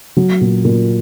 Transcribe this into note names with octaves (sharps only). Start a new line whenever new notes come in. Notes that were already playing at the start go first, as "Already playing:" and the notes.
F#3
A#2
A#2